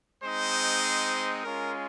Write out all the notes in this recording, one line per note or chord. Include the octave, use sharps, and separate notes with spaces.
G#3 C4 D#4 C5
G#3 C#4 F4 A#4